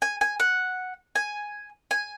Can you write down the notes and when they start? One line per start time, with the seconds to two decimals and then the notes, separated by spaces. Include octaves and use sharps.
0.02 G#5
0.21 G#5
0.40 F#5
1.15 G#5
1.91 G#5